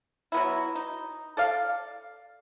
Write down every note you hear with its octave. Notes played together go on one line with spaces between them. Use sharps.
F#3 B3 E4
D#4
A4 D5 F5